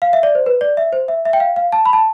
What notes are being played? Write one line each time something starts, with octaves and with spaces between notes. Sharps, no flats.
F5
E5
D5
C5
B4
D5
E5
C5
E5
E5
G5
F5
F5
A5
B5
A5